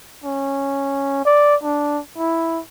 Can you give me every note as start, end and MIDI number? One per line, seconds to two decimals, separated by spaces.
0.24 1.23 61
1.25 1.55 74
1.63 2.00 62
2.18 2.60 64